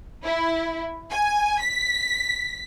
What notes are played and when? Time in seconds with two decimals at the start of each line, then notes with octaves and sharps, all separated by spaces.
0.24 E4
1.10 G#5
1.62 B6